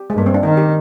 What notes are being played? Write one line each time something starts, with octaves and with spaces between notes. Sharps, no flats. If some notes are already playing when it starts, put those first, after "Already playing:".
Already playing: G4
G#3
G2 A#3
C4
D4
D#3 D#4
G4